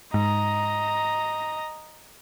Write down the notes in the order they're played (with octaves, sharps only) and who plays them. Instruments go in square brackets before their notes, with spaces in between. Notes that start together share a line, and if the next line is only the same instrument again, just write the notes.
[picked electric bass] G#2 [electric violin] D#5 A#5